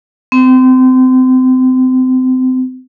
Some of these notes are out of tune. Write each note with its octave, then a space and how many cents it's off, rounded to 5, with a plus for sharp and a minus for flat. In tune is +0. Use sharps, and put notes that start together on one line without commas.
C4 -30